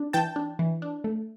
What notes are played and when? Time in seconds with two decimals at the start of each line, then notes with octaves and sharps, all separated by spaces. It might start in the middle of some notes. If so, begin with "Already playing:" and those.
Already playing: D4
0.13 E3 G5 A5
0.36 D4
0.59 E3
0.82 D4
1.04 A3